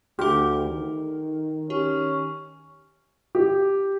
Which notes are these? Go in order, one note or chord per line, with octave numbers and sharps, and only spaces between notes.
D2 G4 A4 F6
D#3
C#4 G4
G4